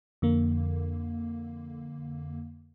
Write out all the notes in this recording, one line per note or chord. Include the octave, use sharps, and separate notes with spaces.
F2 D3 A#3